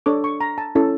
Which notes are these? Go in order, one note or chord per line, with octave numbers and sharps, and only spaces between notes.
D4 A4 C#5 D6
C#6
A#5
A5
C#4 E4 A4